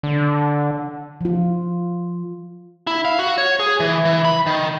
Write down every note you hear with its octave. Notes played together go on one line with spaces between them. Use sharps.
D3
F3 F4
E4
F5
F#4
C#5
G#4
E3
E3
B5
D#3